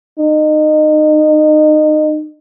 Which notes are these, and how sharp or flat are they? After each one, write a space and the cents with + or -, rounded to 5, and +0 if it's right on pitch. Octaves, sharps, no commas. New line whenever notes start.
D#4 -25